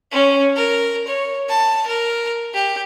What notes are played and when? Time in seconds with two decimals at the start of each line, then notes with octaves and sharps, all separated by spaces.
0.12 C#4
0.56 A#4
1.07 C#5
1.49 A5
1.87 A#4
2.54 G4